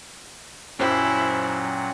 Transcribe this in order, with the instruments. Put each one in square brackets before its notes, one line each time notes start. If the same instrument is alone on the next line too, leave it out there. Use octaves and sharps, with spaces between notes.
[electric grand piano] F#2 C5 [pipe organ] A#2 F#3 F#5 [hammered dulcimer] C#4 G4 [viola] E4